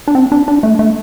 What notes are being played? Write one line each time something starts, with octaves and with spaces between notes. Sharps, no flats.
D4
C4
D4
D4
A3
A3